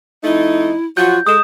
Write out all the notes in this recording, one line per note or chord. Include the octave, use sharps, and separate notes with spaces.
F2 A3 D#4 E4
F3 F#3 F4 F#4 G6
G#3 A4 D#6 E7